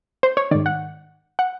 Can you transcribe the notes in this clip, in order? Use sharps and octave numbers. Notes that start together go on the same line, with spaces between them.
C5
C#5
G#2 D#3 D5
F#5
F#5